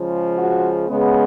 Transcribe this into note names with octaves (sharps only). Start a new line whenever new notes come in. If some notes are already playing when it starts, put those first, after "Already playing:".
Already playing: C#3 F3 G#3
F#4
C#3 G#3 B3